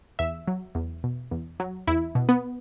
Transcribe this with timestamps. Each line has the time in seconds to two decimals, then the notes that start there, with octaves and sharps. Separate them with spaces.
0.19 E2 E5
0.47 F#3
0.75 E2
1.04 B2
1.31 E2
1.60 F#3
1.87 E2 E4
2.15 B2
2.29 B3